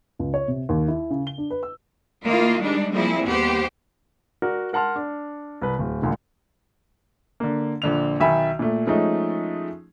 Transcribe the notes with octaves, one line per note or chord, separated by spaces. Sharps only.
C#2
C#5
C3
D#2
E4
C#3
G7
D4
B4
E6
D#3 A3 A#3 E4 F4
G3 G#3 D4 D#4
F3 G3 A#3 C4 E4 G#4
D#2 B3 G4 C5
F#4 A#4 D5 F#5
A#4 F#5 A5 C6 F6
D4
C2 B4
D1
G#1 D2 A#2 D3 G#3
D3 A#3
A#1 D3 F7
B1 D#3 E5 G#5 B5
A#2 A3
F3 G#3 A3 C#4 D#4